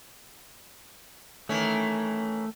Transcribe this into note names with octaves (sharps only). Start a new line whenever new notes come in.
D#3 E3 A3 C#4